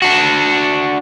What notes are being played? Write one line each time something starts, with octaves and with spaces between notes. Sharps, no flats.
D4 F#4